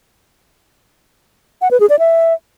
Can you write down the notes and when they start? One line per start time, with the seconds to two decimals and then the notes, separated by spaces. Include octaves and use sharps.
1.62 F#5
1.71 B4
1.80 G#4
1.90 D5
1.99 E5